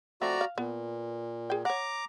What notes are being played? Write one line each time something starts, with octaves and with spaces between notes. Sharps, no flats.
F3 A3 C4 F#4 D5 A#5
F5
A#2 B3
G#4 G5
C#5 F#5 A#5 D6